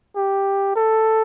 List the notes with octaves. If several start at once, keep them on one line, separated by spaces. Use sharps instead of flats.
G4
A4